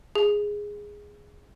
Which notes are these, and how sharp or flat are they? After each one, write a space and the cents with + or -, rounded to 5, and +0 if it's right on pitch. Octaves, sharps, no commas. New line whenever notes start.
G#4 -5